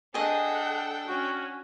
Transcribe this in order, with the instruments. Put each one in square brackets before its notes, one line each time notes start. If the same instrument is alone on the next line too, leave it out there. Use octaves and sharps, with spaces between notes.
[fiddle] D4 G5 [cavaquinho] G#4 D#5 [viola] A4 F#5
[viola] C#4 [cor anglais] F#4